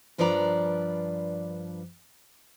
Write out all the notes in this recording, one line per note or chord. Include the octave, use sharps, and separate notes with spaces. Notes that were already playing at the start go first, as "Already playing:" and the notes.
G2 F3 D4 B4 D5 A#5